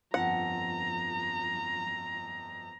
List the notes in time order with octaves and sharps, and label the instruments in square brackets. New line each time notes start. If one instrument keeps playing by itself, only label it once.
[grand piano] G1 F2 A5 [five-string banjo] F#5 [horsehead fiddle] A#5